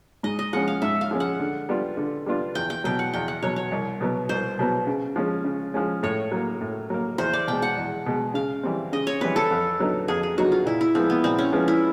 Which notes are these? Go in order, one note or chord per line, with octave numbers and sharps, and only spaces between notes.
G#2 D#5
D#5
F3 G#3 C#4 F#5
F5
G#2 E5
F5
F3 G#3 C#4
F#5
D3
G3 B3 D4 F4
D3
G3 B3 D4 F4
E2 G5
G5
B2 F#3 G5
F#5
E2 G5
F#5
B2 F#3 C#5
C#5
C2
B2 F#3 B3
C2 C5
B2 F#3 B3
C#3
F3 G#3 C#4
C#3
F3 G#3 C#4
A2 C#5
F#3 A#3
A2
F#3 A#3
E2 C5
D5
B2 G#3 G5
F#5
E2
B2 G#3
C#3 F5
E3 G3 C4
C#3 D#5
C#5
E3 G3 C4 B4
A4
F2
D3 F#3 B3 D#4
F2 G#4
G#4
D3 F#3 B3 D#4 F#4
F4
A#2 E4
E4
F3 G#3 B3 C4
B3
A#2 C4
C#4
F3 G#3 B3
E4